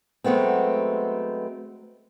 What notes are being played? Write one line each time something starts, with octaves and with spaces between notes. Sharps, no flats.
F#3 G#3 A3 B3 C4